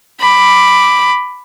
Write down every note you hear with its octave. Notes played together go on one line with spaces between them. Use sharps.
B5 D6